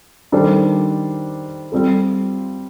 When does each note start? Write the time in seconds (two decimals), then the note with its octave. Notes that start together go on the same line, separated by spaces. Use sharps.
0.32 D#3 G3 D4 A4 C5
1.72 G3 C4 F4 A4